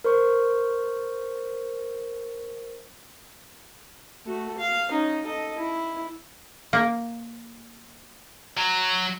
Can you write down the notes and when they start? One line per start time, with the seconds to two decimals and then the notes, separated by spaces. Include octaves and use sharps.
0.04 A#4 C5 C#6
4.26 A3 F#4
4.58 F5
4.88 C#4 D#4
5.25 A4 D#5
5.58 E4
6.73 A#3
8.57 F#3